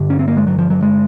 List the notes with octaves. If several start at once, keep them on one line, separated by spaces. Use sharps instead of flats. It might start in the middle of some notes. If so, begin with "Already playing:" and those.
Already playing: G2 D3
C#4
C4
A#3
G#3
F#3
F3
F#3
G#3